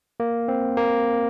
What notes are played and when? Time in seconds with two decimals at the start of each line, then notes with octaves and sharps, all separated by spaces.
0.20 A#3
0.48 C4
0.77 A#3